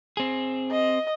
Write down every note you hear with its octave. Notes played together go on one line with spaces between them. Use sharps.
C4 G#4
D#5